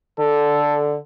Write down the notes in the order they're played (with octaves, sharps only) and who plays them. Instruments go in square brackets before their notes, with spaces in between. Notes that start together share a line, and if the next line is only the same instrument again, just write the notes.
[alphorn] D3 [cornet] A4